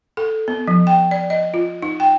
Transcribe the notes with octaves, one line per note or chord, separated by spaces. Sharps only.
A4
B3
F3
G5
D5
D#5
F4
D#4
G5